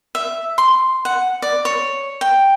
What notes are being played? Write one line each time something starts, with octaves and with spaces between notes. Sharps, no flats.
E5
C6
F#5
D5
C#5
G5